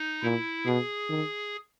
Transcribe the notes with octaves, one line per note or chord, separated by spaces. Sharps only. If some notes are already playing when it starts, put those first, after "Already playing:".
Already playing: D#4
A#2 E4
B2 G#4
D#3